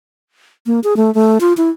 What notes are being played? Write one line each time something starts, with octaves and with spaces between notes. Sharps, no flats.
A#3
G#4
A3
A3
F4
E4